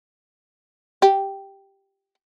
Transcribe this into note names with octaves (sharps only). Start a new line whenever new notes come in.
G4